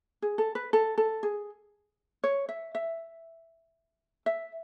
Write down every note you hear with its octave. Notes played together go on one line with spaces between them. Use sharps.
G#4
A4
B4
A4
A4
G#4
C#5
E5
E5
E5